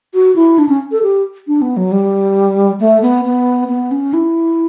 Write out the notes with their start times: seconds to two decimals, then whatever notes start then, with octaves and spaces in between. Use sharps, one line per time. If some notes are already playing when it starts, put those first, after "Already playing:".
0.14 F#4
0.36 E4
0.58 D4
0.69 C#4
0.92 A4
1.03 G4
1.47 D4
1.62 B3
1.77 F#3
1.92 G3
2.80 A3
3.02 B3
3.25 B3
3.68 B3
3.91 C#4
4.13 E4